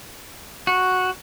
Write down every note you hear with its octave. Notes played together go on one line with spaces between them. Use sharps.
F#4